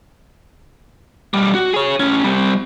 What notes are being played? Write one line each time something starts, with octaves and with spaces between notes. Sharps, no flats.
B1 G3
F#4
G#4 C#5
A2 C#4
G3 C4